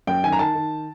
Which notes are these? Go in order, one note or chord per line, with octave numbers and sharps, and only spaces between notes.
F#2 G5
D#3 G#5
A#5
D#3 A5
D#3